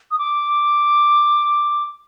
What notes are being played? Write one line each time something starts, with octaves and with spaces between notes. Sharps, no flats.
D#6
D6